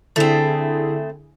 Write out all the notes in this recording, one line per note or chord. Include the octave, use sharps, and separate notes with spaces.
D3 A3 C4 E4 G#4